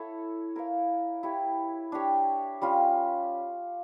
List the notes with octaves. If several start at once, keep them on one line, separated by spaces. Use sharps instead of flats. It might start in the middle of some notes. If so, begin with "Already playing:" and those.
Already playing: E4 A4 C#5
E4 A#4 C#5 F5
E4 G4 C#5 E5
D4 G4 C#5
G3 C#4 F4